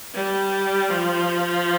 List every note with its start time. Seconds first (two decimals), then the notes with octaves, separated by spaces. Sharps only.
0.14 G3
0.90 F3